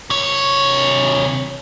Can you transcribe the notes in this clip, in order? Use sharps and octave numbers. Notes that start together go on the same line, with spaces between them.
C3 C#5